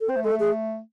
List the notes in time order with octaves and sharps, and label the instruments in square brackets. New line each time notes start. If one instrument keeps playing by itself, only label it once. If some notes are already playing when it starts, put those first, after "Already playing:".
[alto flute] A4
[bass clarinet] C4 [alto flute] C5
[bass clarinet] A3
[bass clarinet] G#3 [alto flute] A4
[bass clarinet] A3
[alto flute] G#4